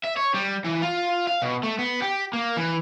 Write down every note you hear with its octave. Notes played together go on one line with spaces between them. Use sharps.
E5
C#5
G3
E3
F4
F5
B2
A3
B3
G4
A#3
E3